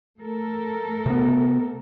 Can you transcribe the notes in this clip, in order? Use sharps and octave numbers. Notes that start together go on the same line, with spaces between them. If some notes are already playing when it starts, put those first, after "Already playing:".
A3 A4 A#4
C3 B3